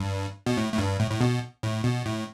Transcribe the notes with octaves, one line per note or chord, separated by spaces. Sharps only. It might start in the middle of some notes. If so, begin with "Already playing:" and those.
Already playing: G2
B2
A2
A2
G2
A2
A2
B2
A2
B2
A2